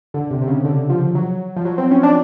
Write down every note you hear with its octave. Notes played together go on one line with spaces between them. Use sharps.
D3
C3
C3
C#3
D3
F3
F#3
F3
F#3
C4
C#4
D4